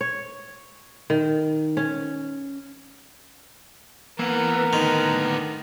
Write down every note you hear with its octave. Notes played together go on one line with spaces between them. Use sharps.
C#5
D#3
C#4
E3 A#3 B3 A#4
A2 D3 D#3